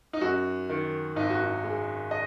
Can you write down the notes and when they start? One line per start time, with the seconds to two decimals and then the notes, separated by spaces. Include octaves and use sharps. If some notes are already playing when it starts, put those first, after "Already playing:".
0.13 D#4
0.21 F#2 F#4
0.69 D#3
1.16 G#1 D#4
1.30 F#4
1.43 D#4
1.63 G#3
2.11 D#5